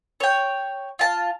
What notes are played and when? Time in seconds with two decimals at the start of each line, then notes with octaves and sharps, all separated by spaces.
0.20 C#5 G5
0.99 F4 A5